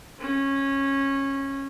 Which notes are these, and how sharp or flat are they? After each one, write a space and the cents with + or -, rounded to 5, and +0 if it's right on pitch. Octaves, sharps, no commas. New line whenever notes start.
C#4 -15